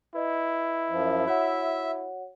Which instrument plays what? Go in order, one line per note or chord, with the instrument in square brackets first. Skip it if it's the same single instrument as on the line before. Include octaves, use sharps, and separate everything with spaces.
[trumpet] E4 [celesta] B4 D#5
[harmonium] F#2 F3
[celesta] F#4 C#5 F#5 [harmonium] E5